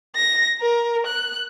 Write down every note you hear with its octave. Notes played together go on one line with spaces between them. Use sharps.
A#6
A#4
F#6